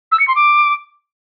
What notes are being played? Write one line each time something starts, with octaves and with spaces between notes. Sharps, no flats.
E6
C#7
C6
D6